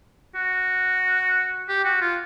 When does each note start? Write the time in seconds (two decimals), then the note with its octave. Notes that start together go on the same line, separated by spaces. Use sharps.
0.35 F#4
1.69 G4
1.85 F#4
2.01 F4